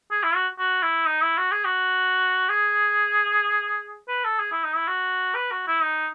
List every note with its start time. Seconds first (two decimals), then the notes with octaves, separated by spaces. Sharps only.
0.11 G#4
0.23 E4
0.35 F#4
0.59 F#4
0.82 E4
1.06 D#4
1.22 E4
1.38 F#4
1.51 G#4
1.65 F#4
2.49 G#4
4.08 B4
4.24 A4
4.40 G#4
4.52 E4
4.64 D#4
4.76 E4
4.87 F#4
5.35 B4
5.51 F#4
5.67 E4
5.82 D#4